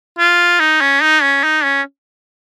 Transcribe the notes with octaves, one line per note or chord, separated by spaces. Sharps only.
F4
D#4
C#4
D#4
C#4
D#4
C#4